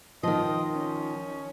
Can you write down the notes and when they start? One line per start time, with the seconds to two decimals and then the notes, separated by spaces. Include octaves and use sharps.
0.23 D#3 F3 D#5
0.74 C#4